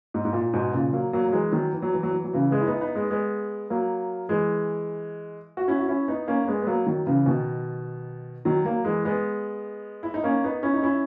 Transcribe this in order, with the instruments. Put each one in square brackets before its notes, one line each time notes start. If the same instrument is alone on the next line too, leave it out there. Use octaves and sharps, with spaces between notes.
[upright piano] G#2
G#2
A#2
G#2 B2
A#2 C#3
F#3 A#3
F#3 A#3
F#3
E3 G#3
D#3 F#3
E3
F#3
E3
F#3
E3
F#3
C#3 E3
G#3 B3
E4
B3 D#4
E4
B3 D#4
G#3 B3
G#3 B3
F#3 A#3
E3 G#3
F#4
C#4 E4
F#4
C#4 E4
B3 D#4
A#3 C#4
C#4
G#3 B3
B3
F#3 A#3
D#3 F#3
C#3 E3
B2 D#3
D#3 F#3
F#3 A#3
E3 G#3
G#3 B3
E4
D#4
A#3 C#4
B3 D#4
C#4 E4
D#4
C#4 E4